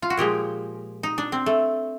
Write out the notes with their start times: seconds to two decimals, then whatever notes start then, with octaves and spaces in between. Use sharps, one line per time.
0.02 F4
0.10 F#4
0.17 A#2 F3 G#3 G4
1.03 D#4
1.18 D4
1.32 C4
1.46 A3